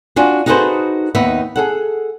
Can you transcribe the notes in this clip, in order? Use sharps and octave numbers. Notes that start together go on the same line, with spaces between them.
D4 F4 F#4 G#5
D#4 F#4 G#4 A4 B4 C5
D#2 B3 D#4 E5
G#4 A4 F#5